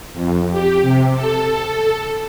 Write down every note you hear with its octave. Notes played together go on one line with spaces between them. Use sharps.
F2
G4
C3
A4